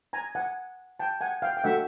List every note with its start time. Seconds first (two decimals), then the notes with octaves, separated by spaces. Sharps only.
0.13 G#5 A#5
0.35 F#5 G#5
0.99 G5 A5
1.21 F#5 G#5
1.42 F5 G5
1.57 G5
1.64 A3 D4 F#4 E5 F#5